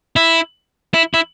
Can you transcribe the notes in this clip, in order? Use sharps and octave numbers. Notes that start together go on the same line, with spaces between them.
E4
E4
E4